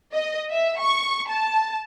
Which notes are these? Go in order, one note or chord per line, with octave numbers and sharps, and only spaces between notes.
D#5
E5
C#6
A5